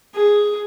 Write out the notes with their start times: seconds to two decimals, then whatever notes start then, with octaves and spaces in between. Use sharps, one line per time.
0.14 G#4